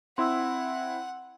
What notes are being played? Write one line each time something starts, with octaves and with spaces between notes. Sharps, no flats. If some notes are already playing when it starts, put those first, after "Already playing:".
C4 E4 F#5 C6 E6